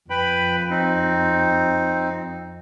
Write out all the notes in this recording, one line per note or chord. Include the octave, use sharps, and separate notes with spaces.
F2 B4 G5 B5
C4 D#4